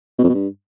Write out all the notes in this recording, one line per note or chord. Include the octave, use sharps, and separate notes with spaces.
B2
F2
B2
G2